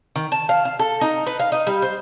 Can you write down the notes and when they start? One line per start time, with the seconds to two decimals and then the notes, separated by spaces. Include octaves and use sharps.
0.16 D#3
0.32 A5
0.49 F5
0.65 F5
0.79 A4
1.01 D#4
1.27 B4
1.40 F5
1.52 D#4
1.67 G3
1.82 C5